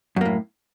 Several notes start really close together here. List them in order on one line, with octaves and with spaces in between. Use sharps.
F#2 A#3 A2